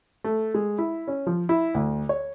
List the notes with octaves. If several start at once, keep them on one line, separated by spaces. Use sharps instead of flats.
A3
G#3
E4
C#4
F3
E4
D2
C#5